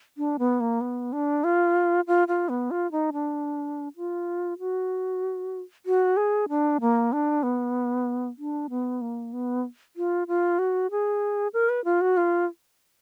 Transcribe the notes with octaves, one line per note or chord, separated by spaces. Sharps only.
D4
B3
A#3
B3
D4
F4
F4
F4
B3
F4
D#4
D4
F4
F#4
F#4
G#4
D4
A#3
D4
B3
D4
B3
A#3
B3
F4
F4
F#4
G#4
A#4
B4
F4
F#4
F4